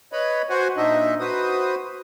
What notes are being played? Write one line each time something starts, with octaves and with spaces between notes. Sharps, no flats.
B4 C#5 D#5 B5
F#4 C5 F#5 G#5
A#2 D4 D#4 D#5 E5
F#4 B4 C5 D#6